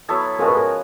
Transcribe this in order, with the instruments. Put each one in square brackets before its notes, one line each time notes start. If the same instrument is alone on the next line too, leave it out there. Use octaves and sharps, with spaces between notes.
[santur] F#3 B3 E4 A4
[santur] F3 G#3 C#4 F#4 [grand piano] A#4
[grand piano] B4
A#4